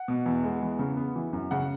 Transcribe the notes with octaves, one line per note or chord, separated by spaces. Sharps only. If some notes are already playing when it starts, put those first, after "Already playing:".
Already playing: F#5
B2
E2
G#3
E2
C#3
B3
E3
F#2
C#3 F#5